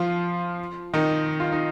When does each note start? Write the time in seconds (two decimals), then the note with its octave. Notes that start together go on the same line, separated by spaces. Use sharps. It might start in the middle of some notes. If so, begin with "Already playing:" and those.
Already playing: F3 F4
0.94 D#3 D#4
1.40 F4
1.52 D#4